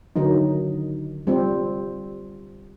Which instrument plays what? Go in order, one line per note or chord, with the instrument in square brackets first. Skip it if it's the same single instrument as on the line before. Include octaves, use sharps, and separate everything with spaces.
[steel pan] D3 D#3 F#3 D#4
G3 C4 F4